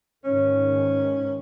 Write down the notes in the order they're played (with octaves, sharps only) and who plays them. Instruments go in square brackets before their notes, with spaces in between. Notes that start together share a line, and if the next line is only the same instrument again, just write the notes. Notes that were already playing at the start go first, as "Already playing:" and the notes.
[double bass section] G#2 D#3 [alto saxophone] C#4